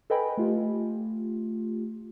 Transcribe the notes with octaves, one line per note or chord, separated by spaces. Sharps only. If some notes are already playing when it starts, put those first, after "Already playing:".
A4 B4 D#5 G5 G#5 B5
A3 F4 G4